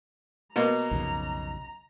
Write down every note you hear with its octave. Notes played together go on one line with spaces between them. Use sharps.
B2 A#3 A#5
B1 F2 C#3